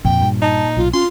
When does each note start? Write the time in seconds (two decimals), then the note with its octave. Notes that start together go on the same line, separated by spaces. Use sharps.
0.05 F2 A#2 G5
0.21 G2
0.42 D#4 A5
0.77 B1 F4
0.94 C#4 F4 C6